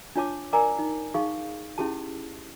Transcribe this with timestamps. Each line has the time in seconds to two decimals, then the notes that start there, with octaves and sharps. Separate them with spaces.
0.16 D4 F4 C#5 A5 D6
0.53 A#4 D5 G#5 A#5 D6
0.79 D#4
1.14 D#4 G#4 F5 C#6
1.78 C#4 E4 G4 G#4 A5